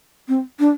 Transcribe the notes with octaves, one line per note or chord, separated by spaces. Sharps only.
C4
D4